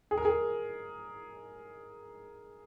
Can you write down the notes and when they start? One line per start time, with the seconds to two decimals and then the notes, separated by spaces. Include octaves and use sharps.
0.11 G#4
0.17 A#4
0.25 G#4